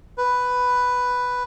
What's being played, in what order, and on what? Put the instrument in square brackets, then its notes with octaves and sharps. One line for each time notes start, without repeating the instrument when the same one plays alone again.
[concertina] B4